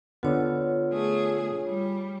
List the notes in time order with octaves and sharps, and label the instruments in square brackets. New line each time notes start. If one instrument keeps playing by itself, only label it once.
[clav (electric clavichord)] D3 B3 [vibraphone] F4 C#5
[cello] A3 G#4
G3